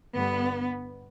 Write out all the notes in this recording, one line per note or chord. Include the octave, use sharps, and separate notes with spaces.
G2 D3 G3 B3